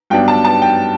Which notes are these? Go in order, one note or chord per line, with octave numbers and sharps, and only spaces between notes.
G2 F#3 B3 D4 G5
A5
A5
G5